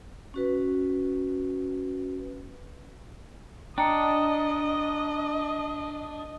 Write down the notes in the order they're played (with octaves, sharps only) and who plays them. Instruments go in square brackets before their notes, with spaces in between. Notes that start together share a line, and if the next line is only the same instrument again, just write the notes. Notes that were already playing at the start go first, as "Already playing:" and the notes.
[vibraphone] C#4 F#4 B4
[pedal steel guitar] D4 [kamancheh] D#5 [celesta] G5 A#5 C#7